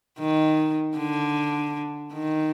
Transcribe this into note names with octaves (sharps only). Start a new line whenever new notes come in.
D#3
D3
D#3